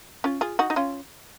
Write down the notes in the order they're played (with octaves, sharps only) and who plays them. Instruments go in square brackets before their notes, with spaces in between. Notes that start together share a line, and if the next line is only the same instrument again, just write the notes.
[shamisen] C#4 F4
F4 G#4
D#4 F#4
D#4
C#4 F4